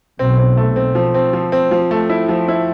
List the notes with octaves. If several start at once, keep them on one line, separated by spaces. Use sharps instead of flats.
B1 B2 C4
C4
A3
C4
F3
C4
F3
C4
F3
A3
E4
F3
E4